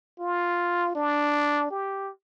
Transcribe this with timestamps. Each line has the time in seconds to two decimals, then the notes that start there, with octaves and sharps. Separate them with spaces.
0.19 F4
0.95 D4
1.70 G4